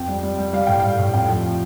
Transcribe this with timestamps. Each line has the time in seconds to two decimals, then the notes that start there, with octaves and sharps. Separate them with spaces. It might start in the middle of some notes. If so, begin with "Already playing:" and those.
Already playing: F2 G5
0.08 G3
0.23 G3
0.39 G3
0.53 G3 F5
0.67 A2 G5
0.80 G3 F5
0.99 A2
1.14 F2 G5
1.29 F3